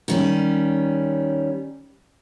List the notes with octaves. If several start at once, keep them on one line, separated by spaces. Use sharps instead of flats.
D#3 G3 C#4